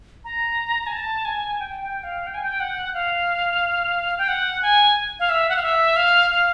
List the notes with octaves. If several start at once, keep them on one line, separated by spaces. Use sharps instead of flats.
A#5
G#5
A5
G#5
G5
G5
F5
G5
G#5
G5
F#5
F5
G5
F#5
G#5
F5
E5
F#5
F5
E5
F5
F5